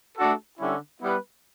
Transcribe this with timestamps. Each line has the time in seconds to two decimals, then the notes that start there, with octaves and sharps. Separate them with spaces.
0.18 A3 D4 F#4 A4
0.59 D3 G3 C#4 E4
1.02 G3 B3 E4 B4